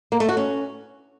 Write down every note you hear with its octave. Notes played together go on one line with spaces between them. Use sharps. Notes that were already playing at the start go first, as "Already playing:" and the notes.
A#3
A3
F#4
C#4